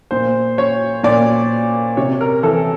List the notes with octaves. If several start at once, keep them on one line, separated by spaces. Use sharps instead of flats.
A#2 C5
C#5
A#2 D5
C3 C#5
A#4
E3 A4